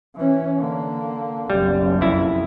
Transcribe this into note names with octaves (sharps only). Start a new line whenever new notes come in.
E3 C#4
D3 A#3
F#1 B1 G3
F2 E4